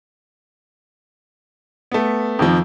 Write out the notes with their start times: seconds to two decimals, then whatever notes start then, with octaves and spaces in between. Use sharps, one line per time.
1.92 A3 B3
2.39 F2 D#3 F3